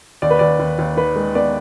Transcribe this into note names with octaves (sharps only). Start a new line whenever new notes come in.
D#2 D5
B4
D#2 D5
D#2
D#2
D#3 B4
G#3
B3 D5